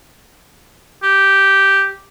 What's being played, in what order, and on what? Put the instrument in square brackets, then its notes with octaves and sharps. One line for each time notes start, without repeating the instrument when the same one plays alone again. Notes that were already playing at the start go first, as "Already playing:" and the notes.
[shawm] G4